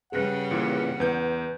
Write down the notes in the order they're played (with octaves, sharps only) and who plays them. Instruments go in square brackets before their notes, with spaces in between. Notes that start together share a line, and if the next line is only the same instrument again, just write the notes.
[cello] C#3 G3 [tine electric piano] G#4 B4 F#6 [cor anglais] F#5
[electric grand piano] A#2 E3
[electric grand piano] E2 G6 [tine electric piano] B4